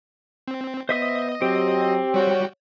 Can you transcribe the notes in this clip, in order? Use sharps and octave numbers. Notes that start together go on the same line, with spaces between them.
C4
B3 C5 D#5 E5 D#6
F#3 C4 G4
G3 F#4 C#5 G5